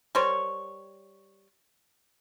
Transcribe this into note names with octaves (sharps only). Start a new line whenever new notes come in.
G3 A#4 C5 C#5